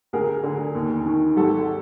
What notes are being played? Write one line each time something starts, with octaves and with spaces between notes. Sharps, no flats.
D2 G#4 A#4
D3
D#2
D#3
G#1 G4 A4